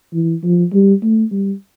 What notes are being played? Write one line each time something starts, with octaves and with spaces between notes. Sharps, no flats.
E3
F3
G3
A3
G3